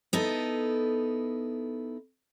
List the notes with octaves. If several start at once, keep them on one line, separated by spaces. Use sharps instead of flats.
B3 D#4 E4 A4